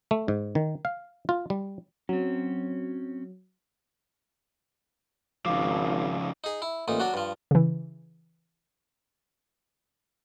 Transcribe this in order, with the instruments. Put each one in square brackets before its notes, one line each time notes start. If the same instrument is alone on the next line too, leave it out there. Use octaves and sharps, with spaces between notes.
[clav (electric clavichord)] A3
G#2
D#3
F5
F4
G3
[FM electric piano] F#3 [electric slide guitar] C4 C#4
[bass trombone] G#1 [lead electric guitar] C#3 F3 [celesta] F5 D6
[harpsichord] D#4 G#4
E4
A1 A#2 D#4
F#3 D4 F#4
G2 F3
[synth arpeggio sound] C#3 E3